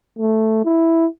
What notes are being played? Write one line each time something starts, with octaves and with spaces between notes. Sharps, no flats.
A3
E4